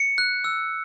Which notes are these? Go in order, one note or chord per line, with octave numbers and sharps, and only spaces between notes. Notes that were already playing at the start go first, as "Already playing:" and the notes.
Already playing: C#7
F#6
E6